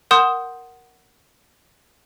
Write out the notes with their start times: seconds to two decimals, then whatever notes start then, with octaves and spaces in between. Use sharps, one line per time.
0.11 A#4 F#5 C6 D#6 G6 E7